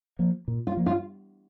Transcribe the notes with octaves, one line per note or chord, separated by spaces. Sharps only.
F3 A#3
A#2
F4
F3 A#3
F4